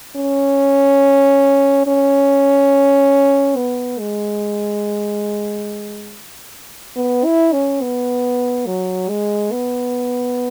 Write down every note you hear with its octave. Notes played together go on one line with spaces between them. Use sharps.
C#4
C#4
B3
G#3
B3
E4
C#4
B3
F#3
G#3
B3